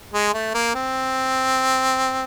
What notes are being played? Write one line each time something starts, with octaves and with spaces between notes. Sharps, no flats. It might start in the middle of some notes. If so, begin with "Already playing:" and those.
G#3
A3
A#3
C4